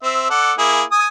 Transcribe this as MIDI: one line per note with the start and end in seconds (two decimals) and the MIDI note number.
0.03 0.26 60
0.03 0.26 76
0.30 0.53 69
0.30 0.53 74
0.30 0.53 78
0.58 0.82 58
0.58 0.82 64
0.58 0.82 68
0.92 1.07 80
0.92 1.07 87